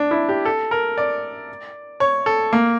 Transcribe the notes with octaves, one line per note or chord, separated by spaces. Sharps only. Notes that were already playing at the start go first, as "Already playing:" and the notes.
Already playing: D4
E4
G4
A4
A#4
D5
C#5
A4
A#3